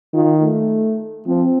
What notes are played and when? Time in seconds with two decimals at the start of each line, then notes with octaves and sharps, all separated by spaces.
0.14 D#3 F4
0.42 A3
1.27 F3 C4